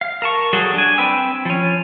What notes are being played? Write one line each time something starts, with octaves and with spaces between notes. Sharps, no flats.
F5
A#4 A5 C#6
F#3 G3 F#4 G#4 A4
D4 G#5
C4 B4 G5 E6
F3 C#4